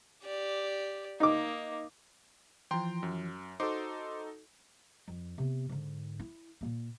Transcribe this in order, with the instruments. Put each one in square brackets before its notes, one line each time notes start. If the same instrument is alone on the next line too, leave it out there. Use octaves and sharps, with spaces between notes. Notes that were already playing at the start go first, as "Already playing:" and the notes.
[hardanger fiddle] G4 D5
[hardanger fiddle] A#3 [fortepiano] D#4 D6
[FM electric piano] E3 F3 [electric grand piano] G5 A#5 C6
[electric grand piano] F#2
[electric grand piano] D#4 F#4 A4 [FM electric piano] C5 C6 D6
[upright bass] F2
C3 B3
G#2 D3
E4
D#1 A#2